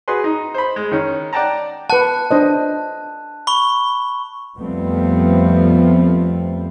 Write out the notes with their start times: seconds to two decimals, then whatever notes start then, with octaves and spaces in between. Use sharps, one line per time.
0.08 F#4 G#4 B4 C6
0.24 D#4
0.54 C5 B5
0.76 G#3
0.91 D#3 C#4 D#4
1.33 D5 F#5 G5 A5 A#5
1.90 B4 F#5 A5 F#6
2.31 D4 C5 D#5
3.47 B5 C#6 G7
4.58 F2 F3 G3 A3 B3 C4